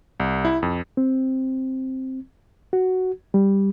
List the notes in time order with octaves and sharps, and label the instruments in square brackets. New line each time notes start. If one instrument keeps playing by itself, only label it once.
[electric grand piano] C2
E4
F2
[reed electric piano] C4
F#4
G3